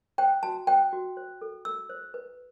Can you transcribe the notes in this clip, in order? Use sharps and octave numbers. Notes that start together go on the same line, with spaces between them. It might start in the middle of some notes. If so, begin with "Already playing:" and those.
C5 G5
F#4 A5
C5 G5
F#4
C5
A4
A4 E6
C5
B4